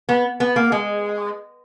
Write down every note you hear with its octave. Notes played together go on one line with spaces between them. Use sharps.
B3
B3
A#3
G#3